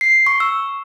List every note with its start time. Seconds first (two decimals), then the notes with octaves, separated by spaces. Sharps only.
0.01 C7
0.26 C#6
0.40 E6